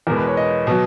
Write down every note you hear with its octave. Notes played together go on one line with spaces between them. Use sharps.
E2 B2 G#3 A#4
B4
C#5
D#5
B2 F#3